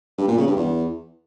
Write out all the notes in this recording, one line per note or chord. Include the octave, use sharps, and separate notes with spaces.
G2
A#2
C#3
G2
E2